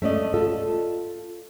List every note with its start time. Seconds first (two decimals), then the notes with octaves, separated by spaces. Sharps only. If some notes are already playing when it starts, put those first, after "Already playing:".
0.02 A3 C#4 D5 D#5
0.34 F4 A4